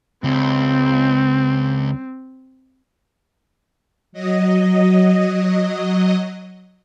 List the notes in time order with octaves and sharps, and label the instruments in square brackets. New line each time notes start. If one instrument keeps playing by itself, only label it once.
[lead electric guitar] C#2 [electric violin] C4
[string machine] F#3 D#5